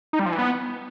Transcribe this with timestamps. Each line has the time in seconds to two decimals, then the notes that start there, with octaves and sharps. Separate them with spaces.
0.13 D#4
0.19 G3
0.26 F3
0.32 E3
0.39 B3